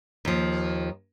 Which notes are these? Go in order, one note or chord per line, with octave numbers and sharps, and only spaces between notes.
D#2 F3